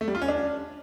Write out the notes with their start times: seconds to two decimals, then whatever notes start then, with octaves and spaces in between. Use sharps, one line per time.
0.01 A3
0.08 G3
0.15 F4
0.22 C#4
0.28 D4